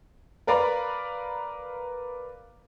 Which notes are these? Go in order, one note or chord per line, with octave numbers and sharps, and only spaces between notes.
A#4 B4 D5 F5 A#5 B5